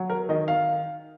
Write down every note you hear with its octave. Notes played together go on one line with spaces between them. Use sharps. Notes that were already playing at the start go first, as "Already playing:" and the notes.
Already playing: F#3
A#4
D#3 D#5
F5